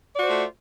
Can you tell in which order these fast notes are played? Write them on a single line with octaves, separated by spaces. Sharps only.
D5 F#4 C5 F4 A3